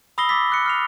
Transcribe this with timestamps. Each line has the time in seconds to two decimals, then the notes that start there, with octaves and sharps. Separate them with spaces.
0.18 B5 D#6 E6 A#6 C7 G7
0.29 B5 D6 E6 A6 B6
0.50 D6 F#6 C#7
0.66 F6 C7 F7